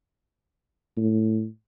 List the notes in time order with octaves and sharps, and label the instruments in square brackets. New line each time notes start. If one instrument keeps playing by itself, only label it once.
[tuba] A2